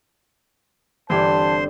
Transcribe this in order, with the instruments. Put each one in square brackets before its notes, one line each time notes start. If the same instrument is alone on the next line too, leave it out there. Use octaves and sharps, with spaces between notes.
[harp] G1 G3 C4 [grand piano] E3 G4 [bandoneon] C5 C6 [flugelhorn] A5